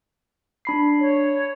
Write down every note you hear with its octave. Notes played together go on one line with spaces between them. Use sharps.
D4 B5 C7
C#5